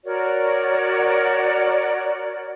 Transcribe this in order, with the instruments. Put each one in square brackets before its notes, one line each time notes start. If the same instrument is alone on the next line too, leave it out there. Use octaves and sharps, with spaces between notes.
[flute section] F#4 A#4 C#5 D5